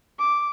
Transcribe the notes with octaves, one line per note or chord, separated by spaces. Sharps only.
D6